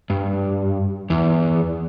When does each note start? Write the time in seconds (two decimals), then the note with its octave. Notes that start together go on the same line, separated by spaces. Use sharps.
0.10 G2
1.10 E2